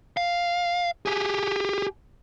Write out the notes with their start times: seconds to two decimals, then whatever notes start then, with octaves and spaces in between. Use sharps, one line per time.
0.17 F5
1.06 G4 G#4